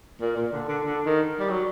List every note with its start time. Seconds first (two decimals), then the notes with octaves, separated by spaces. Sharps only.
0.21 A#2
0.36 A#2
0.52 D3
0.68 D3
0.85 D3
1.05 D#3
1.40 G3
1.49 F#3